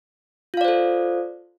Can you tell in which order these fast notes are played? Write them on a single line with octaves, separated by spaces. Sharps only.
F4 F5 D5 C5 A4